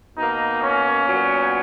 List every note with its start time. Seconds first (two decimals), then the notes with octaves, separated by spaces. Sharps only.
0.17 B2 A#3 D#4
0.62 C#4
1.07 A#2 F#3 B3